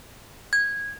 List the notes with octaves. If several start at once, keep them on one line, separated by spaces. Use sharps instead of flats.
G#6